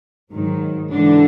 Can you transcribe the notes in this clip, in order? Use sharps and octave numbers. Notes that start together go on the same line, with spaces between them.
G#2 D#3 F#3
G#2 D3 E3 D4